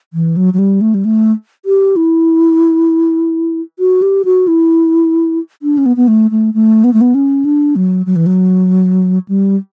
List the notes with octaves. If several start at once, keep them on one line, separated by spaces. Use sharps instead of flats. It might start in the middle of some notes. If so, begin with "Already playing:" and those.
E3
F#3
F#3
G3
A3
G3
A3
G4
E4
F#4
G4
F#4
E4
D4
C#4
B3
B3
A3
A3
A3
B3
A3
B3
C#4
D4
F#3
F#3
E3
F#3
G3